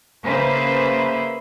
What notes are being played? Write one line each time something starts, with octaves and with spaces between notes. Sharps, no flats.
C#3 A#3 B4 C5 E5